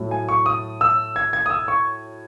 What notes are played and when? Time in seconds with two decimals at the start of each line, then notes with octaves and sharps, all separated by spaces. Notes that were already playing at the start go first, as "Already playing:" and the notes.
Already playing: A2 F#3
0.11 G#5
0.29 C#6
0.46 D#6
0.81 E6
1.16 G#6
1.33 G#6
1.46 D#6
1.50 E6
1.68 C#6